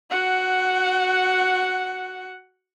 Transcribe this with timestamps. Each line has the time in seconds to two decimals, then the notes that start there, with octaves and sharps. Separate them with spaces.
0.11 F#4 F#5